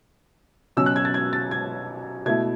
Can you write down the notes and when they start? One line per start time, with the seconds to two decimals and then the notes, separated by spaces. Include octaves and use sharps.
0.77 B2 F#3 C#4 E6
0.86 F#6
0.96 G#6
1.05 A6
1.14 G#6
1.33 A6
1.51 G#6
2.26 B2 A3 E4 G#6